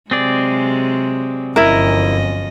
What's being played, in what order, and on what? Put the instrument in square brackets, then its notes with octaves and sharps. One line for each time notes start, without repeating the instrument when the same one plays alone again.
[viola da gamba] C3 F#3 G#3 [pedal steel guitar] C4 G#4 D5
[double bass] G1 [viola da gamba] F#2 F3 D#5 [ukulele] E4 A#4